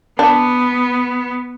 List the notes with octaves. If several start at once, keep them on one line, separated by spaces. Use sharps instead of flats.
B3 D4